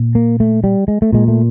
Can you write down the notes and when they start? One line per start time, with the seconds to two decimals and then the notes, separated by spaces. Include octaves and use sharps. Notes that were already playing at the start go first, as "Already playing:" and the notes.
Already playing: A#2
0.15 A#3
0.40 A3
0.64 G3
0.88 G#3
1.02 A3
1.13 A#2 G#3
1.28 A3